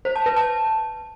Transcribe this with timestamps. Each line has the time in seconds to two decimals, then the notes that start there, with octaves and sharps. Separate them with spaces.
0.05 C5
0.16 A5
0.26 B4
0.36 A5